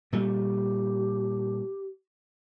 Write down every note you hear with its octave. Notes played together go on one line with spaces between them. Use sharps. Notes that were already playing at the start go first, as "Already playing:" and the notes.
A#2 G3 A3 G4